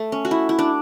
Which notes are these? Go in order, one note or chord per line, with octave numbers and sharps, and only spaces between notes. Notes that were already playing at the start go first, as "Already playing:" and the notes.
Already playing: A3
C#4
F#4
E4
E4
D4